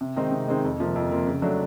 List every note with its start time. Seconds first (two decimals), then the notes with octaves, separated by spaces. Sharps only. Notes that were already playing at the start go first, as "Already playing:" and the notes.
0.01 C3
0.16 D#3 G#3 C4 D#4
0.32 C3
0.48 D#3 G#3 C4 D#4
0.64 F2
0.80 C3 F3 A#3
0.95 F2
1.12 C3 F3 A#3
1.27 C#3
1.42 F#3 A3 D4